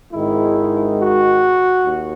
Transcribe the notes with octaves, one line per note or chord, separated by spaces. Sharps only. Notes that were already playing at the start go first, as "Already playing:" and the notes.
G#1 G#2 D#3 G#3 E4
F#4
D#2